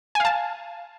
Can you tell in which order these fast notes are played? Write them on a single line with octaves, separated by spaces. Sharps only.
G#5 F5 A5